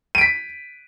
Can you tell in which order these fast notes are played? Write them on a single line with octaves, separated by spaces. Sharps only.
D#7 D7 B6